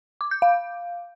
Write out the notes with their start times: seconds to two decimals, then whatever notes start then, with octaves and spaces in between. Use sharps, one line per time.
0.21 D6
0.31 G6
0.42 F5